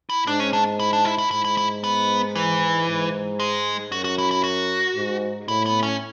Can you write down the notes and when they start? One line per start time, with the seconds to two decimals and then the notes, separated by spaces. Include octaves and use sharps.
0.10 E4
0.27 G#2 D4
0.40 C#4
0.53 D4
0.80 E4
0.93 D4
1.05 E4
1.18 E4
1.31 G#2 E4
1.45 E4
1.57 E4
1.84 B3
2.35 E3
2.88 G#2
3.40 G#3
3.92 F#2 F#4
4.04 F#4
4.18 E4
4.31 E4
4.44 F#4
4.96 G#2
5.48 A2 E4
5.66 B3
5.83 C#4